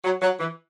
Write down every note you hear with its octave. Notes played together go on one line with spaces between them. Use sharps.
F#3
F#3
E3